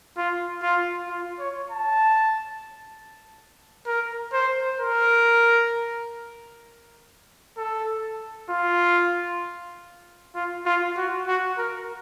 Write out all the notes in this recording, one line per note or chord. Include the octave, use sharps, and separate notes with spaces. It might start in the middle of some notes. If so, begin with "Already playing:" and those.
F4
F4
F4
C#5
A5
A#4
C5
A#4
A4
F4
F4
F4
F#4
F#4
A#4